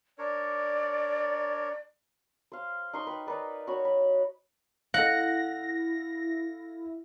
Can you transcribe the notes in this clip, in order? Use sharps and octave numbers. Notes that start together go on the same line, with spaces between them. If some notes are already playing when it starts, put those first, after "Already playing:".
D4 A#4 C#5 D5
C5 F5
D#4 C6 C#6
B4 G5
D#4 A#4 B4 D5
F#4 C#5 B5
B5
E4 A4 F5 F#5 A#6